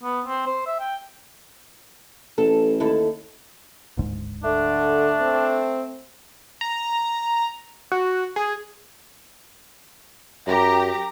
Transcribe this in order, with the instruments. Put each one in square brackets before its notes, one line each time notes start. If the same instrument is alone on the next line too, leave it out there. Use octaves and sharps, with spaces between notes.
[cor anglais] B3
C4
C5
E5
G5
[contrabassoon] A1 [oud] A4
[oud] D#2 E4 A4
[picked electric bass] D1 G#1 G#2
[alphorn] D3 [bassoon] A3 [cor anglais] D4
[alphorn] C4
[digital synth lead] A#5
F#4
G#4
[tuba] F#2 [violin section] G4 A#5